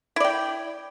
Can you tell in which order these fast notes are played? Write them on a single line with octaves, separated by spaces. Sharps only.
E4 D5 G5